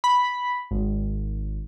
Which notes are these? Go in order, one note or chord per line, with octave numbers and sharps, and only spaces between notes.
B5
G#1